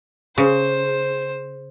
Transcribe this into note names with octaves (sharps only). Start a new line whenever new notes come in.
C#3 C5